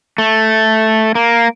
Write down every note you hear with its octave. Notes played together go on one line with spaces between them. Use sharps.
A3
A#3